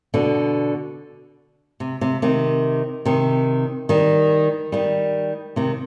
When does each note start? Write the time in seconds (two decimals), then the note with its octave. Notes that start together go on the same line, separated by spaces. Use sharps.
0.14 B2 D3
1.80 C3
2.01 C3
2.22 C3 D#3
3.05 C3 D#3
3.89 D#3 G3
4.72 D#3 G3
5.56 C3 D#3